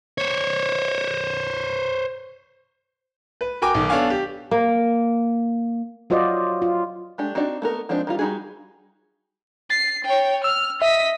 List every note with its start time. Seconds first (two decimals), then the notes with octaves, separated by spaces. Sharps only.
0.18 C5 C#5
3.41 B4
3.62 F#4 A#4 G5 G#5 D6
3.74 B1 D#3
3.89 B3 D4 A4 C#5 F5 G#5
4.10 G4
4.51 A#3
6.10 F#3 F4 F#4 C5 D5 D#5
6.62 F4
7.18 G#3 A3 D4 G4
7.35 C4 D4 D#4 F#4 D5
7.62 A3 B3 A#4
7.89 F3 G#3 C4 D4 D#4
8.07 D#3 G3 F4
8.19 G3 D#4 E4 F#4 G#4
9.70 A6 C7
10.05 C#5 G5
10.44 E6 F6
10.82 D#5 E5 B6